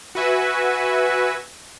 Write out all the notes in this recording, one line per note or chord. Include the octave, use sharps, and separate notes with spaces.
F#4 B4 E5 G#5